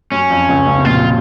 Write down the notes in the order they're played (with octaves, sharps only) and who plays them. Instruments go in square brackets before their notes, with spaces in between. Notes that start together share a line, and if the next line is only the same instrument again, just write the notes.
[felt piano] F#2 F#3 [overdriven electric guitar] C#4
[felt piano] F2 F3
C#2 C#3
C#2 C#3
C3
[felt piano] A#1 A#2 [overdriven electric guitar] F4